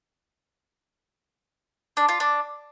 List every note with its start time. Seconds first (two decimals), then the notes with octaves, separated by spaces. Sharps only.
1.97 D4
2.09 F4
2.20 D4